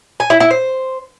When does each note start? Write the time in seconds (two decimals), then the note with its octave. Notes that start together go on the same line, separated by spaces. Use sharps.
0.20 G#5
0.30 E4
0.40 E4
0.51 C5